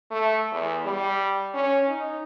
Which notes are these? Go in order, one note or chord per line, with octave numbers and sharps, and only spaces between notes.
A3
E2
G3
C#4
D#4